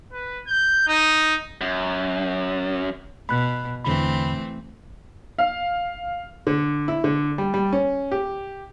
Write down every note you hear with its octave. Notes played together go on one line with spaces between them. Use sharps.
B4
G6
D#4
F#2
B2 B5 F#6
E2 D3 E3 A3 C4 B5
F5
D3
E4
D3
G3
G3
C#4
G4